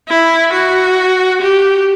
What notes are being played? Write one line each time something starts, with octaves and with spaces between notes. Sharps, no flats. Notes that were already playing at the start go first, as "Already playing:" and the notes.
E4
F#4
G4